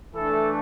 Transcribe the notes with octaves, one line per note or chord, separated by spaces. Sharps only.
E3 A3 D4 A4